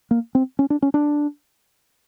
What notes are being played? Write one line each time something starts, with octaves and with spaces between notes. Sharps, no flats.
A#3
C4
C#4
D4
C#4
D4